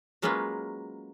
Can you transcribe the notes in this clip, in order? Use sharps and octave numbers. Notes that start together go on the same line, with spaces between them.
F#3 G#3 A#3 C#4 F4 B4